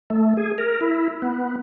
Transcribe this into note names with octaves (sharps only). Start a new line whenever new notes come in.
A3
G#4
A#4
E4
B3